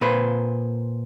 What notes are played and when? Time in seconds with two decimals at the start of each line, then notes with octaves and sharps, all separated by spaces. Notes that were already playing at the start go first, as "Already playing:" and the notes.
0.01 A#2 B4 C5